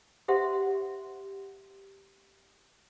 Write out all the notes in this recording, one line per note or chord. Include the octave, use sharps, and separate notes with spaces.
G4 C5 E5 F#5 C6